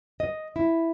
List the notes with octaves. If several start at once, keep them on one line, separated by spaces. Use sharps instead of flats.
D#5
E4